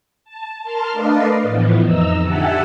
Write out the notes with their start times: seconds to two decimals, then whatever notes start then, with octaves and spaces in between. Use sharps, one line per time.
0.24 A5
0.62 A#4 A5 C6 F6
0.92 A3 D4 B4 D5 D#5 F5
1.43 A2 E3 F3 B3
1.84 F2 D#4 A#5 E6
2.23 D3 G4 E5 F#5 G#5 A5